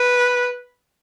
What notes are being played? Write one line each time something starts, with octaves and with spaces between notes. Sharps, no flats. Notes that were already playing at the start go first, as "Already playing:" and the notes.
Already playing: B4